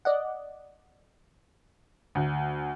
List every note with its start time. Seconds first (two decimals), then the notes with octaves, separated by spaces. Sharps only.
0.05 D5 D#5 F#5
2.15 D2